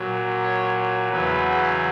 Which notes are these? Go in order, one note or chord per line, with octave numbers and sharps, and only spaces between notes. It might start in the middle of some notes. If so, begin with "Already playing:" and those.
Already playing: A#2 F#3
C#5
E2 C#3 F#3 B4